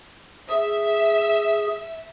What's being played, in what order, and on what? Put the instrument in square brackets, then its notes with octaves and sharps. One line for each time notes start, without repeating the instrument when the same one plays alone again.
[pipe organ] G#4 [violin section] E5